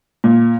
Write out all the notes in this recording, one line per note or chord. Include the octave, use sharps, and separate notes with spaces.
A#2